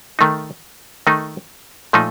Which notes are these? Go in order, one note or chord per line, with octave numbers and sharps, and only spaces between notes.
D#3 A3 D#4
D#3 A3 D#4
A#2 F3 A3 D#4